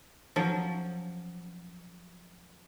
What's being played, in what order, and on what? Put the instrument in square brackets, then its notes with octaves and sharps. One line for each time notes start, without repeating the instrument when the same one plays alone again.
[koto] F3 F#3 C#4